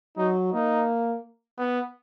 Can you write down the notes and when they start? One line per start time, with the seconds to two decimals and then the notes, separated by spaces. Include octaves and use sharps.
0.17 F#3 D#4
0.52 A#3 D#4
1.58 B3